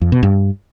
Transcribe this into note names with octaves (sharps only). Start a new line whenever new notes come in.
F2
B2
G2